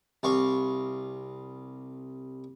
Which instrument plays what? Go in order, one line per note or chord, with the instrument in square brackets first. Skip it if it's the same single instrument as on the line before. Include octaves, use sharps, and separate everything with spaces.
[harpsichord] C2 F5 C#6